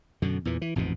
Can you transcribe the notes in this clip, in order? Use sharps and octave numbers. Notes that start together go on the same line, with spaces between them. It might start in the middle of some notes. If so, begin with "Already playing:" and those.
F#2 B2 D3
E2 A#2 E3
E3
A1 F2 G#2 B2